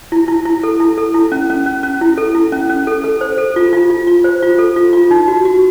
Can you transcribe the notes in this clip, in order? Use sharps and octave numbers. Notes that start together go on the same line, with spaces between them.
E4
E4
E4
A4
E4
A4
E4
C#4
C#4
C#4
C#4
E4
A4
E4
C#4
C#4
A4
A4
C5
A4
F4
F4
F4
F4
C5
F4
A4
F4
F4
D#4
F#4
F#4